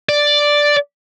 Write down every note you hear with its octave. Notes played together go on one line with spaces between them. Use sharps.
D5